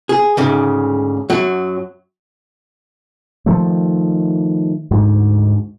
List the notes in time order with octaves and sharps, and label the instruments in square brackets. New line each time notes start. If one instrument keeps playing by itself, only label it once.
[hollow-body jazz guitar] G#4
D2 G#2 C#3
F#2 F#3
[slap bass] D#3 F3 A3
D2 G#2